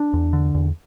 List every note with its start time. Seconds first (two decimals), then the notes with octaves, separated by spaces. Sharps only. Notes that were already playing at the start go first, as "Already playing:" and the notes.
Already playing: D4
0.13 E2
0.33 D3
0.54 E2